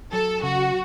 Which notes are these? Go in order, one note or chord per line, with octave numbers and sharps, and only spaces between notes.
F#3 A4
C#3 F#4